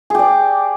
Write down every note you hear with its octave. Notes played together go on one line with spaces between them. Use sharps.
G4 G#4 D5